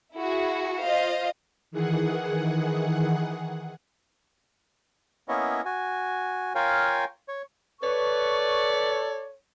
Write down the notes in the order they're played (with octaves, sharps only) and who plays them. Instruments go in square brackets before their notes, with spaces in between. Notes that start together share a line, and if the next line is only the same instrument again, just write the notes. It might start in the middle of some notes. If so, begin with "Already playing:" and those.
[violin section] E4 F#4 G#4
F4 C5 D#5 F5
[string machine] D#3 E3 G#4 F#5
[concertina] A#3 B3 C#4 E4 C#5 D#5
F#4 G#5
F4 A#4 C#5 F5 G5 G#5
C#5
[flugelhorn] A4 [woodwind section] B4 C#6 [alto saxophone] C#5 [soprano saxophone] D5